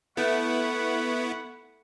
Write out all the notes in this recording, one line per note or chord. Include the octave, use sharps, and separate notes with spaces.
A3 B3 E4 F#5 B5 C#6